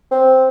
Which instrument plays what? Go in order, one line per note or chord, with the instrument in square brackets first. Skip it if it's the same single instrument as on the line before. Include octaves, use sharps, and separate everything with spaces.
[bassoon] C4